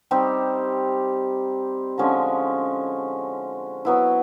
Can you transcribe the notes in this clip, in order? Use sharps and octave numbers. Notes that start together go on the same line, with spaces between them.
G3 C4 D#4 G4
D3 F3 G#3 C#4
F#3 B3 E4